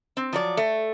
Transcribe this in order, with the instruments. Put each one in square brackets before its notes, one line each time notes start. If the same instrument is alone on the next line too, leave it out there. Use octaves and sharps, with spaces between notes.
[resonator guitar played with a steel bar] C4
F3 F#3 D5
A3